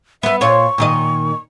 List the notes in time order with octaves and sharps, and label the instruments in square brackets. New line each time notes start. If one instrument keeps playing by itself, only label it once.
[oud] B3 B4 [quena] E5
[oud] A#2 F4 C#5 [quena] C#6
[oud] A#2 D#3 D#5